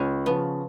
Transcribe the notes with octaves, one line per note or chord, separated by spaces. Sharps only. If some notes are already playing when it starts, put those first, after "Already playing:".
Already playing: C#2 C#4
C#3 F3 B3